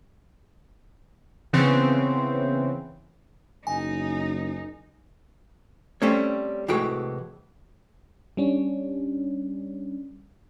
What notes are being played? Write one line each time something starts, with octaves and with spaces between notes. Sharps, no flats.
C#3 E3 B3 C4
F#1 D#4 G#5
G3 A3 C4 C#4 C#5
C2 A2 E3 G#3 F#4 G5
G3 C#4 D4